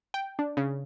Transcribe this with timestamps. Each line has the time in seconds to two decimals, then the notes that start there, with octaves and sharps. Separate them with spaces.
0.14 G5
0.39 D4
0.57 C#3